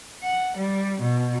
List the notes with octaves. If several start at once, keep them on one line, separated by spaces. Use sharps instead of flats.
F#5
G3
B2